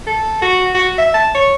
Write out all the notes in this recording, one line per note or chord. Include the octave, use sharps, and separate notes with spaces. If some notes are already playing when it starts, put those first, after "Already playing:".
A4
F#4
F#4
E5
A5
C#5